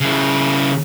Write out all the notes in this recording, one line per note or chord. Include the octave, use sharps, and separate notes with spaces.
C#3 E4